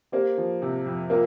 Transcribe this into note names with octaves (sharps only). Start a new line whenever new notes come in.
A#3 G4 C5
F3
C3
F2
A#3 F4 A#4